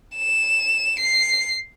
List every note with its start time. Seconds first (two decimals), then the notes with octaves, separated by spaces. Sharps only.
0.17 E7
1.00 C7